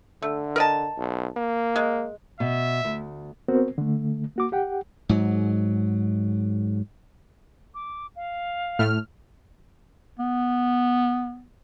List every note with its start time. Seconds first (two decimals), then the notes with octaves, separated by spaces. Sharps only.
0.22 D3 A3
0.56 A#4 D#5 A5
0.97 B1
1.37 A#3
1.76 G#3
2.40 B2 E5
2.84 D2
3.48 B3 C4 F#4 A#4 C5
3.78 D3 A3
4.36 A#3 F#4 D6
4.52 G4 F#5 G5
5.09 G#2 F#3
7.74 D6
8.16 F5
8.79 A2 A3 F6
10.19 B3